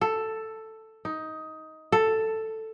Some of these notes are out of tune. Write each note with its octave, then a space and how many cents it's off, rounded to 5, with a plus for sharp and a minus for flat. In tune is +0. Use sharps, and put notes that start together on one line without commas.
A4 +5
D#4 +15
A4 +5